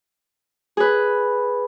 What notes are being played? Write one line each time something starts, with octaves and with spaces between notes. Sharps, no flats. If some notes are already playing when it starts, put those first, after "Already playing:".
G#4 B4